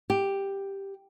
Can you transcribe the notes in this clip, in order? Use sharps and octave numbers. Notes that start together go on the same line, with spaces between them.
G4